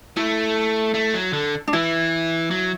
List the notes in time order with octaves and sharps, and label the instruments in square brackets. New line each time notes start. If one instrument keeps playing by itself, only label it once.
[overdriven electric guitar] A3 [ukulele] E4
[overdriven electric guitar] A3
F#3
D3
[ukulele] D4
[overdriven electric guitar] E3 [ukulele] E4
[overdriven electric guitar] F#3